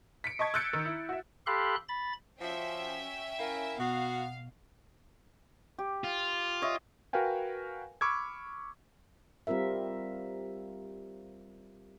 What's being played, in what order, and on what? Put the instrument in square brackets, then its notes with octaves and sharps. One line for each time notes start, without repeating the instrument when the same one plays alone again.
[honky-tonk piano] B6 C#7 D7
D#5 A5 C#6 G#6
E6 F#6 G6 A6 C#7 D7
D#3
E4
F#4 E5
[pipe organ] G4 A4 F5 B5 C6 F#6
B5 A6
[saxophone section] F3 [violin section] C#4 E5 G5 [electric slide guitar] F#4
[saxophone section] E4 A#4 [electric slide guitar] F5 G#5
[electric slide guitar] B2 [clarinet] B3 [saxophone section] F#4 [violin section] F5
[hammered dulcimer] G4
[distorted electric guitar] F4
[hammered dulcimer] C#5 D#5 E5
[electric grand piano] F#4 A#4 B4 F5 G5 G#5
B5 C#6 D6 E6 F6 G#6
[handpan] G3 C4 F4 A#4 E5